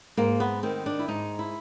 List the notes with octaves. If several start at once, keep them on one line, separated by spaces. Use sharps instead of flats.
G#2 A#3
B3
D#3 C4
D4
E4
G#2 D#4
E4